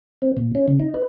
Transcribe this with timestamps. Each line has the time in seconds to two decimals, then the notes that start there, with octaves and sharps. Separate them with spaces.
0.22 C4
0.37 A#2
0.55 C#4
0.68 C#3
0.80 D#4
0.94 B4